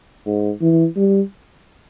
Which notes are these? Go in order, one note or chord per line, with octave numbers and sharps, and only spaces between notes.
G#2
E3
G3